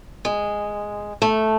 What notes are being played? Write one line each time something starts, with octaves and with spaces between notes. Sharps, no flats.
G#3
A3